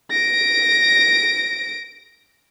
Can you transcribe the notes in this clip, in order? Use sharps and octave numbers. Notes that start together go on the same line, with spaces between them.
A#6 D7